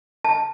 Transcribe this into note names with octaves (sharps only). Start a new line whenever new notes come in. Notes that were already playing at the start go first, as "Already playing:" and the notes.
A5